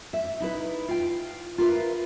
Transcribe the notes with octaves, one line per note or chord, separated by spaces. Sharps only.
E5
D#4 E4 B4
F4 G5
F4 A#4 B4 E5